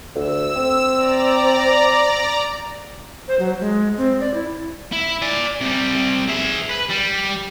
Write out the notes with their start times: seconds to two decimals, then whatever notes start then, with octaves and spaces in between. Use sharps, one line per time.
0.15 D2 E6
0.56 C4
0.94 D5 A#5
3.28 C5
3.39 F#3
3.61 G#3
3.98 C4
4.20 D5
4.34 E4
4.93 E4
5.22 D5 G#5
5.61 C3 G3
6.29 G#4 E5
6.71 B4
6.90 G3